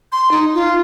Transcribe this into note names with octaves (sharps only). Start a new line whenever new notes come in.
C6
D#4
F4